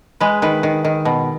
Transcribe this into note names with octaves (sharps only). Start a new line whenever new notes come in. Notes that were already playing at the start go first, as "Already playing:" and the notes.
G#3 B4
D#3 B4
D#3
D#3
B2